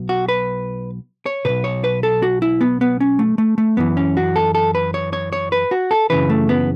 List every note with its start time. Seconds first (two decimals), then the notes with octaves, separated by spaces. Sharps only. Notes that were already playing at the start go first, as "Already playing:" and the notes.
Already playing: B1 B2
0.09 F#4
0.28 B4
1.26 C#5
1.45 B1 B2 B4
1.64 C#5
1.84 B4
2.03 A4
2.22 F#4
2.42 E4
2.61 B3
2.81 B3
3.00 C#4
3.19 A3
3.38 A3
3.58 A3
3.77 F#2 E3 B3
3.97 C#4
4.17 F#4
4.36 A4
4.55 A4
4.75 B4
4.94 C#5
5.13 C#5
5.33 C#5
5.52 B4
5.71 F#4
5.91 A4
6.10 F#2 C#3 E3 B4
6.29 A3
6.49 B3